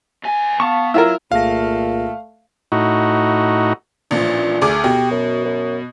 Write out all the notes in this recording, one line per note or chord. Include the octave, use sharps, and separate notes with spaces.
D2 G#5
B3 F5 A5 C#6
F#3 E4 F4 A#4 E6
C2 A#2 A3 G#4 F5 A#6
A2 D#4 F#4
A1 A#2 F3 D4
D2 G#4 D6
B2 G4
F#2
F#2